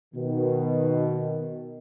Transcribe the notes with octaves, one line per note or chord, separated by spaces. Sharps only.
B2 D#3